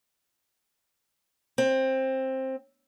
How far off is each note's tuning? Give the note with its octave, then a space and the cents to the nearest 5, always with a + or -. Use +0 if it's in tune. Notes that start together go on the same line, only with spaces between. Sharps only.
C4 +15